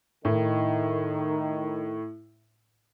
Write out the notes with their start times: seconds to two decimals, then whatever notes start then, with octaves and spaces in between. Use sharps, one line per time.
0.25 A2 D#3